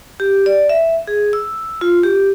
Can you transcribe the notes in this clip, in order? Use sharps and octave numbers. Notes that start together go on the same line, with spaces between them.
G4
D5
E5
G#4
E6
F4
G4